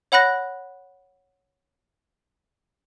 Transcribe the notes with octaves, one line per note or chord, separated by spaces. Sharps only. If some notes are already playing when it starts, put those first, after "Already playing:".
C#5 F#5 B5 F#6 A#6